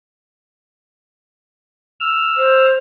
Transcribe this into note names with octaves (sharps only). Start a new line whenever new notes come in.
E6 F6
C5